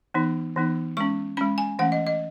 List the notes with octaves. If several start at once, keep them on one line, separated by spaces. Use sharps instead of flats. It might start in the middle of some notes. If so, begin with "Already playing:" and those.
E3 B3 D#4
E3 B3 D#4
G#3 C#4 C#6
G#3 C#4 B5
G#5
E3 A3 C#4 F#5
D#5
D#5